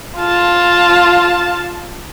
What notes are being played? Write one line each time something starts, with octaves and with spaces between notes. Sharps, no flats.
F4 A5